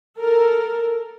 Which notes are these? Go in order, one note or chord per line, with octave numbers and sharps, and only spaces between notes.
A4 A#4